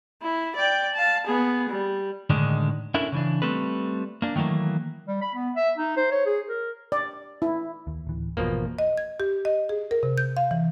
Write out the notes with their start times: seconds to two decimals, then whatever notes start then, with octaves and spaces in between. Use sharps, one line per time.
0.22 E4
0.56 D5 G5
0.95 F5 A5
1.27 B3 G#4
1.69 G3
2.30 A2 D3 D#3 G#3 D4
2.94 C#4 D4 E4 A4 A#4
3.12 C#3 E3 D4
3.42 G3 A3 C4 A4 B4
4.22 A#3 D4
4.36 D#3 E3 F#3 A3 A#3
5.08 G3
5.22 B5
5.35 B3
5.56 E5
5.78 D#4
5.97 C5
6.12 C#5
6.26 G#4
6.49 A#4
6.92 D5
7.42 E4
7.87 D#2
8.07 D1 E3
8.37 G#1 E2 B2 F3 A#3
8.79 D#5
8.98 G#6
9.20 G4
9.45 D#5
9.69 G#4
9.91 A#4
10.03 C3
10.18 G6
10.37 F5
10.51 E3